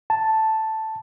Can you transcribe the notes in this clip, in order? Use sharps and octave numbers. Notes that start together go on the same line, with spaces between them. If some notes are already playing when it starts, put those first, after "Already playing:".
A5